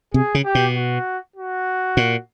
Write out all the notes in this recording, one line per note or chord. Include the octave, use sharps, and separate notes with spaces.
C3 G#4
C#3
G4
B2
F#4
F#4
A#2